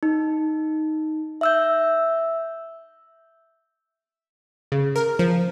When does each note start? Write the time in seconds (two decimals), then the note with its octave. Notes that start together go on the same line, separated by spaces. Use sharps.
0.03 D#4
1.41 E5 E6 G6
4.72 C#3
4.96 A#4
5.19 F3